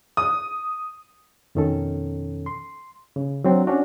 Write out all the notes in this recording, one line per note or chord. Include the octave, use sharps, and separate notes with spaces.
D#6
F2 B2 D#3 C#4 A4
C6
C#3
F#3 C4 D4
C#4 D4 F#4